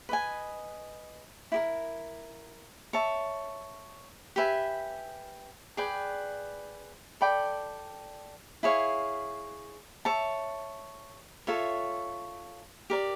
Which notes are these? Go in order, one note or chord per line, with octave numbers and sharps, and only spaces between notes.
B4 D#5 G#5
E4 G4 A#4
C#5 E5 A5
G4 B4 E5 G#5
G#4 B4 D5 G5
A4 D5 G5 B5
E4 G#4 C#5 F5
C#5 E5 A5
F4 A4 C#5 E5
G4 A#4 D5